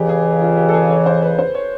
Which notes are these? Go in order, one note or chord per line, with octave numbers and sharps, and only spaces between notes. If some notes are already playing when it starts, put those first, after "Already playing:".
Already playing: F2 C#3 E3 G4
G#4
F4
G4
A4
G#4
C#5
C5
B4
C5
C#5